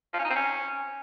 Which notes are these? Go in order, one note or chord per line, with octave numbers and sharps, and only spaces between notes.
F3
C#4
D#4
C4
C#4